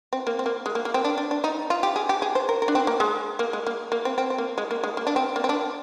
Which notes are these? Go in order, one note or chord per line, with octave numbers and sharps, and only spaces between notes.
C4
A#3
C4
A#3
G#3
A#3
A#3
C4
D4
D4
D4
D#4
F4
G4
G#4
G4
G#4
C5
A#4
A#4
D4
C4
A#3
G#3
A#3
G#3
A#3
A#3
C4
C4
C4
A#3
G#3
A#3
G#3
A#3
D4
C4
A#3
C4
D4